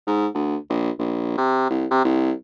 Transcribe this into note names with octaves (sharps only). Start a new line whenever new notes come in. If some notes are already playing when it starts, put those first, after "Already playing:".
G#2
D2
A#1
A#1
C3
C2
C3
C2